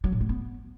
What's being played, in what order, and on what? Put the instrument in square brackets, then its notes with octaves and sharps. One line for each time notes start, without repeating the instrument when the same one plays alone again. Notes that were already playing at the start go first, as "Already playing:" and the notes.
[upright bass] F#3
A2
A3
B3